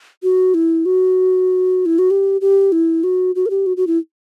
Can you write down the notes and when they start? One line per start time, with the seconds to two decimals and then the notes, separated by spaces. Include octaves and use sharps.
0.23 F#4
0.54 E4
0.86 F#4
1.86 E4
1.99 F#4
2.11 G4
2.41 G4
2.72 E4
3.04 F#4
3.35 F#4
3.46 A#4
3.50 G4
3.66 F#4
3.77 F#4
3.87 E4